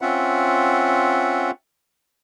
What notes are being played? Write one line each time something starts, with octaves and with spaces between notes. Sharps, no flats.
C4 C#4 F4 E5 F#5